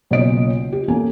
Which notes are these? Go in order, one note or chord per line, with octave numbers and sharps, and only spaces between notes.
B1 C#3 A#3 F4 D#5 D7
G4
A1 A#3 A4 G#5